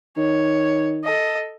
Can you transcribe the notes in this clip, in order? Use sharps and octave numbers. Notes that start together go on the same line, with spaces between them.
D#3 C#5
A4 D#5